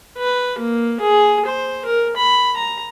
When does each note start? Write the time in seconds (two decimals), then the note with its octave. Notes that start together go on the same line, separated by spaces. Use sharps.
0.17 B4
0.59 A#3
1.00 G#4
1.46 C5
1.85 A#4
2.17 B5
2.56 A#5